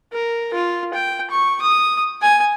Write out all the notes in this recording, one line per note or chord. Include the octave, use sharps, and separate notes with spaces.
A#4
F4
G5
C#6
D#6
G#5